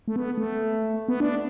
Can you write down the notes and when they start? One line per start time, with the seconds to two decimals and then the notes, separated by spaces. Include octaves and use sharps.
0.08 A3
0.16 B3
0.38 A3
1.08 B3
1.20 D4